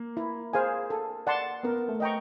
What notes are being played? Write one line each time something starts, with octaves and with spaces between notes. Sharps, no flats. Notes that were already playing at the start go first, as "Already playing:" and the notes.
Already playing: A#3
E4
G#4 C5 F5 G#5
A4
D5 F#5 A5 C6
B3 A#4
A3
D#5 G5 A#5 C#6